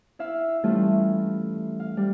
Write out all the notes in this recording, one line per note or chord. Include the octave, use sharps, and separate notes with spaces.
E4 E5 F5 E6
E3 G3 A3 C#4 E4 F4
F5
G3